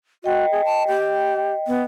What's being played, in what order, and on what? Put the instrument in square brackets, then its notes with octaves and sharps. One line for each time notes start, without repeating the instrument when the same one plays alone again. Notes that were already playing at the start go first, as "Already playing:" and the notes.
[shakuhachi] F#4 [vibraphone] D#5 G5
[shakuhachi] G#4
A5
G4
B3